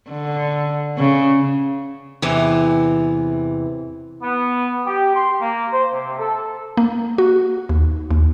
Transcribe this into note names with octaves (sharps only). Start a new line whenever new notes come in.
D3
C#3
E2 C3 E3
B3
G4
C6
A#3
C5
C3
A4
A#3
F#4
D#2
D#2